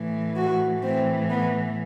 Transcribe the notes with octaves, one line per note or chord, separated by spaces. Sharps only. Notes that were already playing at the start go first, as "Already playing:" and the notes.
Already playing: A2 E3
F#4
A2 E3 C4
B3